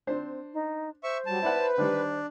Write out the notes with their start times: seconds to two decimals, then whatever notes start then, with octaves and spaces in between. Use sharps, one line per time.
0.07 C4 D4 C5
0.54 D#4
1.03 C5 E5 C#6
1.26 F#3 G3 A5
1.42 E4 B4 D5 F#5
1.78 D#3 G3 D4